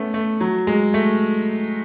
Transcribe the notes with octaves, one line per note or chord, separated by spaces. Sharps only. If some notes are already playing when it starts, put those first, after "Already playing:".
Already playing: A3 B3 C#4
A3
F#3
G#3
A3